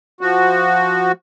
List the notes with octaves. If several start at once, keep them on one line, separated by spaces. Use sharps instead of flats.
F3 F#4